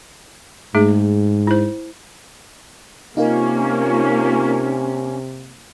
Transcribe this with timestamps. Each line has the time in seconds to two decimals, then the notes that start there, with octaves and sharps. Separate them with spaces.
0.75 G#2 A3 D#4 G#4
1.47 E4 C5
3.17 C3 A#3 C#4 D#4 F4 A#4